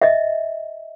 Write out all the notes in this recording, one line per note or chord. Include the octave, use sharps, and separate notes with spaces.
D#5 E5